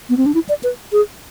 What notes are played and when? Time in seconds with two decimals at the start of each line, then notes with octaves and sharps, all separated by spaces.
0.09 B3
0.17 C4
0.26 D4
0.34 E4
0.49 D5
0.63 B4
0.92 G#4